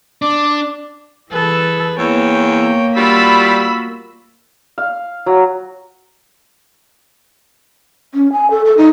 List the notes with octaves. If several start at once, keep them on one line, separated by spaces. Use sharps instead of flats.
D4 D6
E3 G#4 A4 B4
E2 A#3 C#5 G5
G3 F4 F#4 B5 E6 B6
F5
F#3
C#4
G#5
A4
A4
D#4